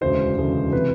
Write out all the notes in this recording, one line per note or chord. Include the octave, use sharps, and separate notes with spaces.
E1 D2 C#3 E3 C5
E1 D2 C#3 E3
C3 E3 B4